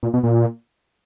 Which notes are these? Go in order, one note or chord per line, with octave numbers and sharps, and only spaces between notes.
A#2
B2
A#2